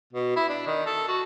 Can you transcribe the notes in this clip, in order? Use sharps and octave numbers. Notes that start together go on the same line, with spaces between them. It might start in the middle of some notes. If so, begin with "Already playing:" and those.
B2
E4
D4
D#3
A4
F#4